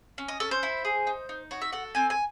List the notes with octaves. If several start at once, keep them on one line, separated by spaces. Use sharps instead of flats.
C#4
D#5
C#4 A4
C5
E4
G#4
D#4
D#4
F#4 C#5
E5
A4 F#5
C4 G#5
G#5